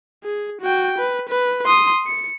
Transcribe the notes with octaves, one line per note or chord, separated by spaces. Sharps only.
G#4
F#4 G5
B4
B4
C6 D#6
C#7